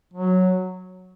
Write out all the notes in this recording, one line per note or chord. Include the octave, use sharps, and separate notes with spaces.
F#3